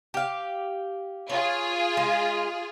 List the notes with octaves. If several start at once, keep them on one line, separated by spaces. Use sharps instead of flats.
G4 F5
F4 G#4 C#5
G#3